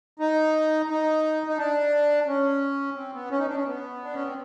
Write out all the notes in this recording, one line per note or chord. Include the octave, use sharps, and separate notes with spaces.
D#4
D#4
D#4
D4
C#4
C4
B3
C#4
D#4
D4
C#4
B3
D4
C#4
C4